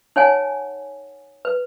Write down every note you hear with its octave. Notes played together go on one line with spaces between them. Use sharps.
D#4 C#5 F#5 G#5
B4